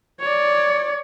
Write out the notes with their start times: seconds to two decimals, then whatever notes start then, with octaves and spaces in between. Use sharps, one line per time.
0.20 C#5 D5